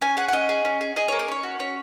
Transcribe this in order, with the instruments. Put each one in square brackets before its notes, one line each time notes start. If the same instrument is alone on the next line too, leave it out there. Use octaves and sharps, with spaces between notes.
[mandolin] C#4 G#5
G#4 F#5
F#5
C#4 D#5
G#4
C#4
G#4
G#4 D#5
A#3 C#5
A#4
C#4 C#5
F#4
C#4 C#5